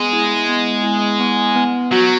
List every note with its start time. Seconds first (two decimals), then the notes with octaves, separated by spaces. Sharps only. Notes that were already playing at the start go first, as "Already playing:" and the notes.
Already playing: G#3 B3
0.13 E4
0.48 B3
0.84 E4
1.20 B3
1.56 B3
1.92 F#3 F#4